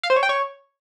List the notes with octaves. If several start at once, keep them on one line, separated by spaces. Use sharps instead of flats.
F5
C5
C#5
G5
C#5